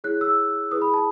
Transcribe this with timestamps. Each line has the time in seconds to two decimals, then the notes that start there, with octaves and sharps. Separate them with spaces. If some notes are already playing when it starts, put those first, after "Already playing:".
0.04 E4 G#4 C#5 F#6
0.21 E6
0.71 E4 G#4 B4 D#6
0.82 B5
0.94 A5